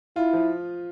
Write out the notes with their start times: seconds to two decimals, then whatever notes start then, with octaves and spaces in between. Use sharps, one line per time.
0.16 E4 F4
0.33 F3